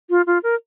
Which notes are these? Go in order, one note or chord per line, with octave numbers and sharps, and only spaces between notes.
F4
F4
A#4